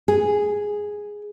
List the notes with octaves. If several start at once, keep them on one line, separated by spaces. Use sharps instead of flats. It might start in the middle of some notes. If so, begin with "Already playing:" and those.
G#4